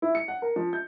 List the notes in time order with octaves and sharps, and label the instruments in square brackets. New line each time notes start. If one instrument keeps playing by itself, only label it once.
[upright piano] E4
C#7
F#5
A#4
F3
G6